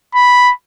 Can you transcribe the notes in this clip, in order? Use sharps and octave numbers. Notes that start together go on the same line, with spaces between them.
B5